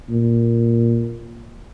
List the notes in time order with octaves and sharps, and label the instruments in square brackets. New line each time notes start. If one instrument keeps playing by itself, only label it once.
[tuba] A#2